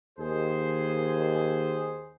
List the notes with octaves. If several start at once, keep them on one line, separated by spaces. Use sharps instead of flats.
D#2 G#4 C5